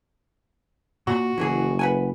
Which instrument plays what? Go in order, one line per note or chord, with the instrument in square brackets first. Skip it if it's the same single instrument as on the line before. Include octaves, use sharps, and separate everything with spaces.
[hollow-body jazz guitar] A#2 [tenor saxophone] F#4
[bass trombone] F#1 [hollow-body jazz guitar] E3 F#3 G#4
[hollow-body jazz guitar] B4 F#5 G#5